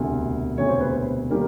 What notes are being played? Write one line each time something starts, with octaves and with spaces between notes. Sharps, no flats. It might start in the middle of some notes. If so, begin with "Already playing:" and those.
Already playing: E1 D2 C3
E1 D2 C3 C#5
C5
B4
C5
D#3 G3 A#3 A#4